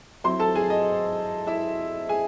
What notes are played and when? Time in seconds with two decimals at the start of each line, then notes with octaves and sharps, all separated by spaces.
0.24 F#3 C4 E4 C5 C6
0.39 A4 A5
0.55 G#4 G#5
0.70 D#5
1.47 E4 E5
2.09 G#4 G#5